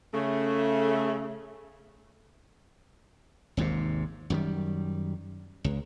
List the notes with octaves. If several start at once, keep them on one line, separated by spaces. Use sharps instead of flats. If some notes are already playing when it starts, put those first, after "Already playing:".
C#3 A3
G#1 D#2 G#2 C3
F#2 D#3 G3
C#2